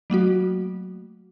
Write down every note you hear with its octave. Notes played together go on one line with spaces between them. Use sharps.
F#3 A3 A#3 F#4